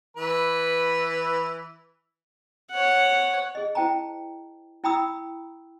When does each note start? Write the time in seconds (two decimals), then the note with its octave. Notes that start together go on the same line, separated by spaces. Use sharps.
0.17 E3 B4 B5
2.71 C#5 F#5
3.55 G#4 D#5
3.75 E4 C5 G5 A5 A#5
4.84 E4 G5 A#5 B5 D#6 E6